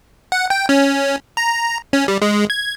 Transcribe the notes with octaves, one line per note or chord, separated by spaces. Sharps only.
F#5
G5
C#4
A#5
C#4
G3
G#3
G#6